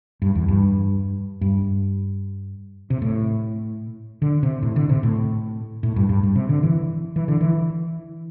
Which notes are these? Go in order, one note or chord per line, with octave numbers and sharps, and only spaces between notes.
G2
E2
G2
G2
C3
A2
D3
C3
A2
D3
C3
A2
A2
G2
G2
G2
C3
D3
E3
E3
D3
E3